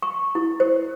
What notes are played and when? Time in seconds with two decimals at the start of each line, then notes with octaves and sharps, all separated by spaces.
0.02 C#6
0.35 E4
0.60 C5